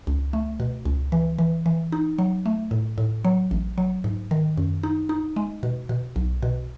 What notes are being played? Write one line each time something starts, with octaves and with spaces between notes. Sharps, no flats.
C#2
A3
B2
C#2
E3
E3
E3
D#4
F#3
A3
A2
A2
F#3
A1
F#3
G#2
D#3
F#2
D#4
D#4
G#3
B2
B2
B1
B2